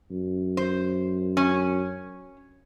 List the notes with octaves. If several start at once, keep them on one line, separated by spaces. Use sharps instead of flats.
F#2
C5
C#4